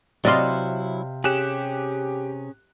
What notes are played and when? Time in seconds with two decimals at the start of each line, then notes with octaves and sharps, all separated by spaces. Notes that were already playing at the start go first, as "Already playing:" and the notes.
0.25 C3 F#3 E4 D5 D#5 F5 C6
1.24 C#4 G4 G#4 F#6 E7